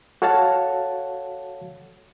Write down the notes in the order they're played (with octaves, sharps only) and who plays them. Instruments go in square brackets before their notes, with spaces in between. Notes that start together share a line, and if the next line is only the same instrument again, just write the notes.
[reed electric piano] F#4 A4 C#5 F5 F#5 A5